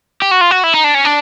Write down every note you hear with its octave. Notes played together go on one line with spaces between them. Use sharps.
G4
F#4
F4
F#4
E4
D#4
D4
C#4
D4